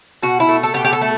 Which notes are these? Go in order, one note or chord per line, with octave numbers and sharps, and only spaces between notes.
B2 F#4
E4
A3
A4
B2 G4
G4
A4
A3